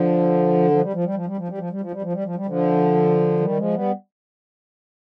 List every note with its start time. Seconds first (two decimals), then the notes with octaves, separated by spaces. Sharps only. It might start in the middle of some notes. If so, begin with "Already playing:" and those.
Already playing: D3 F3
0.71 F3
0.81 G3
0.93 F3
1.04 G3
1.15 F3
1.26 G3
1.37 F3
1.48 G3
1.58 F3
1.70 G3
1.81 F3
1.91 G3
2.02 F3
2.13 G3
2.24 F3
2.36 G3
2.46 D3 F3
3.40 D#3 G3
3.57 F3 G#3
3.74 G3 B3